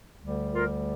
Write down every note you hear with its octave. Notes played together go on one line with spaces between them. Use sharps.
D2 D3 G3
F4 A#4